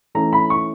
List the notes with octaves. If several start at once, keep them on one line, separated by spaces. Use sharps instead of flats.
E3 A3 C#4 A#5
B5
C#6